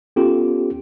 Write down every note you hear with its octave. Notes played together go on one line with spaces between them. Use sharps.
B3 C#4 F4 G4 A4